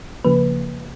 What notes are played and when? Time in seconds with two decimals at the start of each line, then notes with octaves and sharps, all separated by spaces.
0.24 C#3 F3 A#3 B4